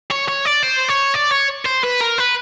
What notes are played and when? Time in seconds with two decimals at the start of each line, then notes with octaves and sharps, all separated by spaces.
0.11 C#5
0.28 C#5
0.45 D5
0.63 C5
0.89 C#5
1.15 D5
1.32 C#5
1.66 C5
1.84 B4
2.01 A#4
2.18 B4